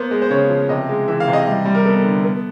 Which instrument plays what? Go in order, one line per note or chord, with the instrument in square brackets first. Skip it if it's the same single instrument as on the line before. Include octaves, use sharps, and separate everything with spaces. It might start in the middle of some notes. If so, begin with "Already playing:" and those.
Already playing: [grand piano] A#3 B3 C5
G#3
C5
C#3 C#5
F3
C3 D#5
G#3
E3 E5
F5
C3
D#5
G3
G3
A#4
B3 A4
D3
B3